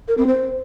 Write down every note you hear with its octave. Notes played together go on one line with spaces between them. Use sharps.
A#4
C4
C5